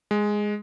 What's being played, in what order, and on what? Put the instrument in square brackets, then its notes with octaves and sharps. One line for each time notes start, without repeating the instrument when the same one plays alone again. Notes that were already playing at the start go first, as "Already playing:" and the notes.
[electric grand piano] G#3